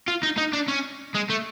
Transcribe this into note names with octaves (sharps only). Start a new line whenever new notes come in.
F4
D#4
D#4
D4
C#4
G#3
A3